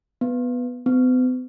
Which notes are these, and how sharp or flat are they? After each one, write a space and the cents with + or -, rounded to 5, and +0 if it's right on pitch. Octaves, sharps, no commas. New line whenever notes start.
B3 +0
B3 +45